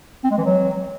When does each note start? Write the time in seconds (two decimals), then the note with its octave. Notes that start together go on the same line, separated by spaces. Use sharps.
0.24 C4
0.31 G#3
0.38 E3
0.44 F#3